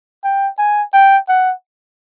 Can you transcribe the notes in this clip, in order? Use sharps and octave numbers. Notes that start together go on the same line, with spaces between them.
G5
G#5
G5
F#5